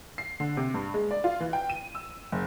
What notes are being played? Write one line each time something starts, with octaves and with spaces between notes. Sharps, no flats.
C7
D3
C3
G2
G#3
D5
F4
E3
G5
D#7
E6
F#1